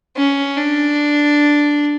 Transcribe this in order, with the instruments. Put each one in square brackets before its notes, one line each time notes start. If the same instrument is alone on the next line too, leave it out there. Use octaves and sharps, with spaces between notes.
[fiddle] C#4
D4